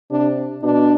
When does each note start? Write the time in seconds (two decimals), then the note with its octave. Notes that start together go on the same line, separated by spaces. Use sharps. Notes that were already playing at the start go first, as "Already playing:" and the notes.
0.11 C3 D4
0.63 B2 D4